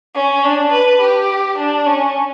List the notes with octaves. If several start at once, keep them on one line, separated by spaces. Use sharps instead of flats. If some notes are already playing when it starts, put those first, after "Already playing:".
C#4
D4
B4
G4
D4
C#4